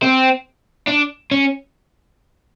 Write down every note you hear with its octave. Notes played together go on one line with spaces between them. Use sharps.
C4
D4
C#4